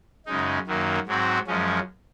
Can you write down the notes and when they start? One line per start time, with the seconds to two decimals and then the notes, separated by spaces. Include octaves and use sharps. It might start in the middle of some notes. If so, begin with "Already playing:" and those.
0.26 F#2 C#3 G#3 D#4
0.67 F#2 D#3 F#3 A#3
1.07 G#2 F#3 C4 F#4
1.47 F#2 F3 G#3 C#4